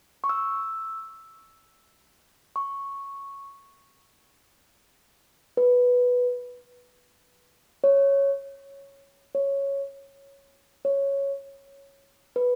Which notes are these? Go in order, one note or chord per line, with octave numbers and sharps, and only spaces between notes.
C#6
E6
C#6
B4
C#5
C#5
C#5
B4